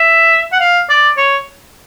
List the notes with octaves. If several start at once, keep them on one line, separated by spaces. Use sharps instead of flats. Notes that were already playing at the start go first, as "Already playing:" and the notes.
Already playing: E5
F#5
F5
D5
C#5